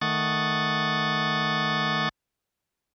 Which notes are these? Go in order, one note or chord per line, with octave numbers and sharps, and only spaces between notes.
D#3 A3 F#5 C#6 D#6 A6